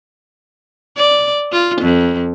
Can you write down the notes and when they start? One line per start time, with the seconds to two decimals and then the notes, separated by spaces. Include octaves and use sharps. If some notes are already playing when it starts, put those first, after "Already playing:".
0.97 D5
1.52 F4
1.81 F2